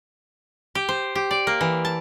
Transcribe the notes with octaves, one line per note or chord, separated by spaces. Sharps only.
G4
C5
G4
D5
A#3
E3
A5